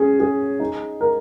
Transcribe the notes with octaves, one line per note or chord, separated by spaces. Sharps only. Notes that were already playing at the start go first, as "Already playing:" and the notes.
Already playing: C#4 G#4
G#4
D#4
A#4